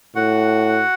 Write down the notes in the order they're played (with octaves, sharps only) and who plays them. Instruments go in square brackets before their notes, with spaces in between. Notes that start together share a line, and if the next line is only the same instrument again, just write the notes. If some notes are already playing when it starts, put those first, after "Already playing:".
[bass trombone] A2 [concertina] F#4 F#5